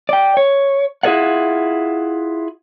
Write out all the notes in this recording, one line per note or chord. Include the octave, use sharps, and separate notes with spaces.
D5 G5
C#5
E4 F4 G#4 A#4 D5 F#5